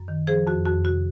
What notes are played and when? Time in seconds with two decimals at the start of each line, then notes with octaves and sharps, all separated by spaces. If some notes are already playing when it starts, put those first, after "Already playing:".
Already playing: F#2
0.08 D#3
0.27 F3 G#4 C5
0.47 F2 F#4
0.65 F2 F#4
0.85 C3 F#4